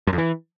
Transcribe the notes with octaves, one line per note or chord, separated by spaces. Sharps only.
F#2
F2
E3